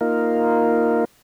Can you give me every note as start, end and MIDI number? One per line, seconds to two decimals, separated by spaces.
0.01 1.05 58
0.01 1.05 63
0.01 1.05 65
0.01 1.05 70